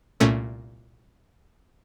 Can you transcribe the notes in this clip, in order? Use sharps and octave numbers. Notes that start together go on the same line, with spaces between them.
C2 A#2 A3 C#4